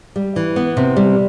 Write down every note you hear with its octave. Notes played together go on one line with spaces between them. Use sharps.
G3
E3
B3
C3
G3